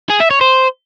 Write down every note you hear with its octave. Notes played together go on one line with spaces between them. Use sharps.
G#4
E5
C#5
C5